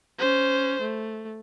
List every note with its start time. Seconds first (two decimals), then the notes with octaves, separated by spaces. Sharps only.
0.19 C#4 C5
0.82 A3